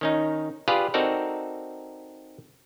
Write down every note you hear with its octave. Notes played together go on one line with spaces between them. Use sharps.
D#3 C#4 D#4
F4 G4 G#4 B4 D5 F5
C4 D#4 F#4 A4 A#4 D5